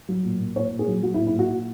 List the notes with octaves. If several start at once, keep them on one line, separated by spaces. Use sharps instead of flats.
F#3
A#2
A#2
A#2 C#5
A#2
G#4
F#3
F#3 F#4
E4
A#2
E4
A#2 F#4